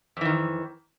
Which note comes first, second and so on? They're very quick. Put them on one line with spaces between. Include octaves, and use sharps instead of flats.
F2 E3 D#3